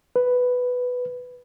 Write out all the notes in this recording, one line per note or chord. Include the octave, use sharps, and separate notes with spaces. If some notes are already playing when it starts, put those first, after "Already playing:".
B4